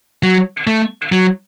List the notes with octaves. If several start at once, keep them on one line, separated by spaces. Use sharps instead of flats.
F#3
A3
F#3